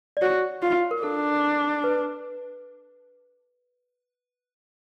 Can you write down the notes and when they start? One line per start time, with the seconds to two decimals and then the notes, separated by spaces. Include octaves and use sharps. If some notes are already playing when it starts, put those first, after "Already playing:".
0.17 D5
0.22 F#4 C#5
0.62 F4
0.91 A#4
1.03 D4 A4
1.84 B4